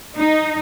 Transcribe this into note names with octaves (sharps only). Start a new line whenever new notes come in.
D#4